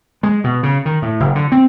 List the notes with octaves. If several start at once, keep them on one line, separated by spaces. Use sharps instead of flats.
G#3
B2
C#3
D#3
A2
F#1
D3
C4